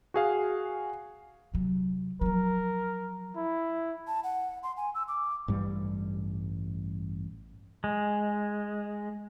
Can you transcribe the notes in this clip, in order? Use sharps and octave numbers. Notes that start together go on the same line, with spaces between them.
F#4 G#4 F5
C3 F#3
F3 F#3 A#4
E4
A5
F#5
C6
G#5
E6
D6
A1 G2 G3
G#3